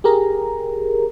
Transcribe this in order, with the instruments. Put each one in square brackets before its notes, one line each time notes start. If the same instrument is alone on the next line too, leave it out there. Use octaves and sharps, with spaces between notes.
[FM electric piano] G4 G#4 A#4 A#5